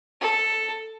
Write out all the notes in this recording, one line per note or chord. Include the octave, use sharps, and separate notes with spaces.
A4